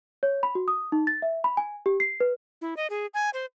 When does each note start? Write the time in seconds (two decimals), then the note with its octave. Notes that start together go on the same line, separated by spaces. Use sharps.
0.23 C#5
0.43 B5
0.55 F#4
0.68 D#6
0.92 D#4
1.07 A6
1.22 E5
1.44 B5
1.57 G#5
1.86 G4
2.00 C7
2.20 B4
2.61 E4
2.77 D#5
2.90 G#4
3.14 G#5
3.34 C5